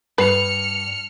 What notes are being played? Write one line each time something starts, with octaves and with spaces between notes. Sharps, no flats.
G2 B4 F6 C#7